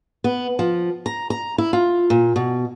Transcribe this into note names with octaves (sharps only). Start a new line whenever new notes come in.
B3
F3
A#5
A#5
E4
F4
A#2
B2